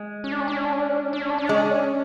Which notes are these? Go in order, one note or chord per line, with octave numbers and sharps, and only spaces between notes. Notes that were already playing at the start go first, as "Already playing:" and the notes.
Already playing: G#3
C#4
D4
C#4
D4
C#4
D4
C#4
D4
C#4
D4
C#4
D4
C#4
D4
C#4
D4
G#3 C#4
D4
C#4